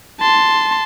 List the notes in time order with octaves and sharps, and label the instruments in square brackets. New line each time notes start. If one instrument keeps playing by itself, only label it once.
[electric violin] A5 C6